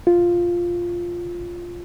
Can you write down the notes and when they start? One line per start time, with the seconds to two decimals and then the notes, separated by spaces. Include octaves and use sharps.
0.07 F4